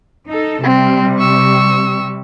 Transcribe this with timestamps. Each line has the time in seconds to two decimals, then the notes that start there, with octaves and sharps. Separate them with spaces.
0.29 D#4 A4
0.63 C3 G3 C4
1.19 C#6 E6